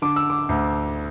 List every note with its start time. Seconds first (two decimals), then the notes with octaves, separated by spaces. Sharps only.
0.02 D3 D6
0.16 E6
0.30 D6
0.49 D2